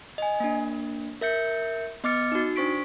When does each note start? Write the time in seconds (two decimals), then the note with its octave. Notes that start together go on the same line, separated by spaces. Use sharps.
0.18 D#5 G#5
0.40 A#3 D4
1.21 A#4 E5 G6 C#7
2.04 B3 D#5 D6 F6 A6 C#7
2.32 D#4 F#4
2.56 D4 C5 C#6 B6 D7